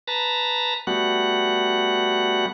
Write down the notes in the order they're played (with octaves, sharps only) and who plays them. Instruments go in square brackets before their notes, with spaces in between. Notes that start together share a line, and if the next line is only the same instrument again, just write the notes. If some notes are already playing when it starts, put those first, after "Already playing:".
[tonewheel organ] B4 A5 A#5
G3 A3 B3 F#4 F#5